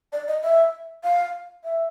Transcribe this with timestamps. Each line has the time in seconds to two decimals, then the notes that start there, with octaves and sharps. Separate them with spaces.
0.13 D5
0.28 D#5
0.44 E5
1.04 F5
1.64 E5